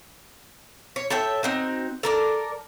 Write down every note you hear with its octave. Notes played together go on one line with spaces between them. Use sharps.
C#5
A4 C#5 E5 G5
C4 D#4 F#4
A4 A#4 D5